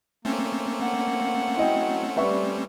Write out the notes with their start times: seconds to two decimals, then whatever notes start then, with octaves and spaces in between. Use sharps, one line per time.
0.25 A3 A#3 C4 C#4
0.80 F#5
1.57 F#3 E4 D#5 G5
2.17 G3 B4 E5 C#6